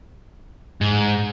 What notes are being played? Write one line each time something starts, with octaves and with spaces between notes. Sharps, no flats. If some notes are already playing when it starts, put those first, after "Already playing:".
G#2